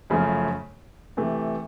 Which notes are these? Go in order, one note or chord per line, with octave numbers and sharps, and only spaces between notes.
F#2 C#3 F3 A3
C3 E3 A3